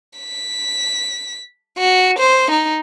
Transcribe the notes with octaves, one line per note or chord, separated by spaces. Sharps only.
B6
F#4
C5
D#4